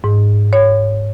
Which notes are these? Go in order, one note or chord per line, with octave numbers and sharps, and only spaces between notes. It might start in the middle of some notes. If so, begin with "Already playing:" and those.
G#2
C#5